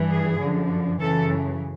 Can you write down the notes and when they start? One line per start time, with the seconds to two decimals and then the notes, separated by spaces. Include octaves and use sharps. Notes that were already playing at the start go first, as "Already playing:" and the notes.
Already playing: G2 E3 G3
0.11 G#4
0.40 F#2 D3 F3
1.00 F#2 C#3 E3 A4